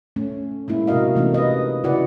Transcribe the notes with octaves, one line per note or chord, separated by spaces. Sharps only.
A3 C#4
G#3 A#3 E4
C3 A#3 F#4 A#4 D#5 F5
C3 E3 A3 A#3 C#4 D#4
B4 D#5
C#3 E4 F#4 B4 D5 F#5